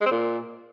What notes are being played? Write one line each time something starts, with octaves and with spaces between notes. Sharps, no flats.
G#3
C4
A#2